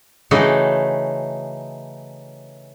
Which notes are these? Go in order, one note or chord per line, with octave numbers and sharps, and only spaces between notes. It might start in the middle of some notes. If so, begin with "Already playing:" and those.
C#3 E3 A3 D#4 F#4